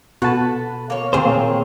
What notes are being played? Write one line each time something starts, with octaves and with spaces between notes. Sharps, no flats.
B2 F#4 A4 B4 F#5 A5
A#3 C#5
A#2 D#3 C4 G#4 C5 C#5
A#3